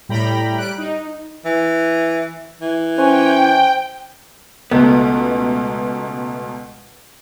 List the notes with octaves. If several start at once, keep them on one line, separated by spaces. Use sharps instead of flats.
A2 G3 G5 A#5 B5 A#6
G3 F#6 D7
D#4
E3
E3
C#4 C5 G5
C#2 B2 A3 B3